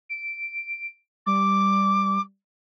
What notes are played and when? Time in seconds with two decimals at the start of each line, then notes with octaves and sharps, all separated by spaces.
0.09 D7
1.26 G3 D6